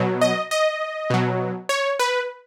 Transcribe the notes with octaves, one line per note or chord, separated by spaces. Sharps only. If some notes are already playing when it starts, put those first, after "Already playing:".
Already playing: B2 F#3
D#5
D#5
B2 F#3
C#5
B4